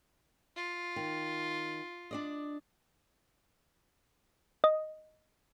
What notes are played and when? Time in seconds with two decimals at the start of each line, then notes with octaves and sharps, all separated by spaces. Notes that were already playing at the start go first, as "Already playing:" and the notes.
0.56 F4
0.96 D#3
2.11 D4 D5 D#5
4.64 D#5